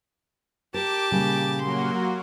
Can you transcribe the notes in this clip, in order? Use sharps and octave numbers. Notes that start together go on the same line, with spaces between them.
G4 A#4 A5 D6
A#2 C#3 G3
F#3 A#3 F#4 C6